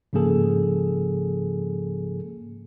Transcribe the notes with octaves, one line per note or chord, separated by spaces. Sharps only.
G#2 C#3 F3 A#3 G#4 A4